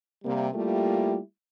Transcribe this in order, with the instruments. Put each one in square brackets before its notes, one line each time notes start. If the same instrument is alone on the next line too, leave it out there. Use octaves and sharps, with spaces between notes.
[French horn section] C3 G3 A#3
G3 A3 A#3 E4 F4 G4